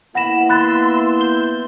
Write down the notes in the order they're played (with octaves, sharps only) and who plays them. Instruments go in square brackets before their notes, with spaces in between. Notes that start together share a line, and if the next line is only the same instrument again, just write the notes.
[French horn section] A#3 B3 E4 [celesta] F#5 A#6 E7 [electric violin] B5
[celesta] B5 F#6 A6 [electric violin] C6 E6
[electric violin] G6 [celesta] G7